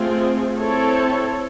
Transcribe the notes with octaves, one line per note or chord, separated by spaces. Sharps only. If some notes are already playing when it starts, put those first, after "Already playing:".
Already playing: A3 C4 F4 G#4
C4 E4 A4 C#5